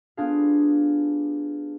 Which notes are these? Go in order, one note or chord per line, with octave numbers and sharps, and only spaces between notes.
B3 D4 F4 G4 G#4 F5